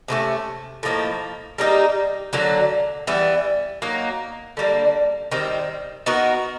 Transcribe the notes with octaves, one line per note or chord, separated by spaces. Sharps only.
C3 E3 A3 C#4
A2 F3 A#3 D#4
G3 A#3 D#4 G4
D3 F#3 A#3
E3 G3 B3
F#3 A#3 D#4
D3 G3 A#3
D#3 G3 C4
B3 D#4 F#4 A#4